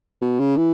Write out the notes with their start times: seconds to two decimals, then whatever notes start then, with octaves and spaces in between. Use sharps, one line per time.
0.22 B2
0.40 C#3
0.57 E3